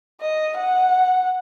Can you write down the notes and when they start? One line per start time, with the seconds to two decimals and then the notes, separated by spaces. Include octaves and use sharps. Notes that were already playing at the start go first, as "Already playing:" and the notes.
0.21 D#5
0.59 F#5